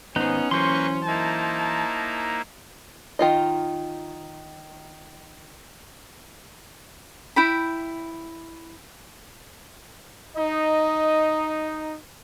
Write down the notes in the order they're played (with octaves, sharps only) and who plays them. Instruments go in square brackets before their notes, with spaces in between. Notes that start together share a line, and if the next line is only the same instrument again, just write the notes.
[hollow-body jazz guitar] D#2 G#2 C5 [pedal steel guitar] B3 D#4 [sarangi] C#4
[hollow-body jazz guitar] E3 F#3 [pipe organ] A#3 B4 C#6 [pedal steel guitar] C5 C6
[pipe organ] A#3 D#4 E4 [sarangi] A5
[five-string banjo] D#3 F4 D#5
[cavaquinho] E4 G5 B5
[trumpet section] D#4 [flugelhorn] D#5